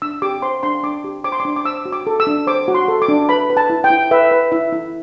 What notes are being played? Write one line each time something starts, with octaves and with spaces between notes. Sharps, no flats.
D4 E6
G4 D6
C5 C6
D4 C6
D4 D6
G4
C5 D6
C6
D6
D4
D6
C5 E6
F#4
D6
A4
E6
D4
C5 D6
F#4
C6
A4
D6
D4
B4 B5
B4
A5
E4
G5
E4
B4 E5
B4
E4 E5
E4